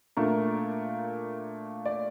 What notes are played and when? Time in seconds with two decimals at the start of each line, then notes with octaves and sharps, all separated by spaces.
0.17 A#2 A3 D4 F4 A#4
1.86 D5